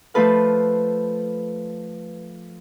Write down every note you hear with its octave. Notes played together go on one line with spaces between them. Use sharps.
F3 A3 F4 A4 B4 F5